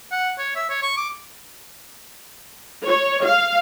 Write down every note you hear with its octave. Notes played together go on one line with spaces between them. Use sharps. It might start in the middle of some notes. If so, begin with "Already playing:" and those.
F#5
C#5
E5
C#5
C#6
D6
C#5
F5